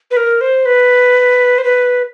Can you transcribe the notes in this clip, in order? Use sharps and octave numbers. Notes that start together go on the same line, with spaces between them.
B4
A#4
C5
B4
C5
B4